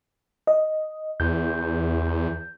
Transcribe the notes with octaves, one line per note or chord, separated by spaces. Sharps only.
D#5
E2 G6